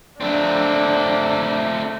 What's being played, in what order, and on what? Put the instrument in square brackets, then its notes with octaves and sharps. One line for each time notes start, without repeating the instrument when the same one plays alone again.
[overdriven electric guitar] A3 C4 [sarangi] D4